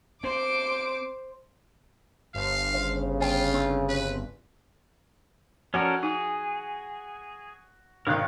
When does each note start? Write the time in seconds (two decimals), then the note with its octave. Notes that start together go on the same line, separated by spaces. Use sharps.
0.24 C4 C5 D6 D7
2.34 G1 F5
2.74 C#3 C5
3.21 F4 C5 G5
3.54 C4
3.89 B4
5.74 F3 C#4 F#4 A4 A#4
6.03 D#4 G#4
8.07 G#1 D#3 A#4 F5 F#6